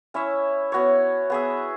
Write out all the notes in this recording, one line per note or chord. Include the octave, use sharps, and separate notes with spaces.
C#4 E4 C#5 E5
B3 F#4 C#5
B3 G#4 E5